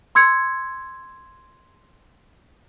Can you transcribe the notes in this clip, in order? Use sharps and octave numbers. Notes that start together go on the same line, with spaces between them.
C6 E6 G#6 C#7